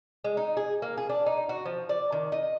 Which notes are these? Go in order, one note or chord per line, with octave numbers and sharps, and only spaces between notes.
G#3
D#4
G#4
A#3
G#4
D4
D#4
F#4
F3
D5
D#3
D#5